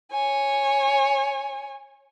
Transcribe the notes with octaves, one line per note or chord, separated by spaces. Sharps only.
C#5 G#5